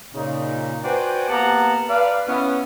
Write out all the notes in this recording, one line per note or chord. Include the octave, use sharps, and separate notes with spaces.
A#2 C#3 D#4
F#4 B4 C5 D5 G5 G#5
A#3 B3 G4 F#5 A5 A#5
B4 D5 F5
B3 C#4 E4